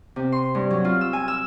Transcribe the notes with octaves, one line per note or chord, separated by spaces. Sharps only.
C3
C6
G2
F#3
F4
E6
G#5
E6